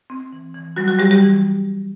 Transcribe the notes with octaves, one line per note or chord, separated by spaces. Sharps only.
C4
E3
E3
F#3 G3 F#4
F#3 F#4
G3 G4
G3 G4
E3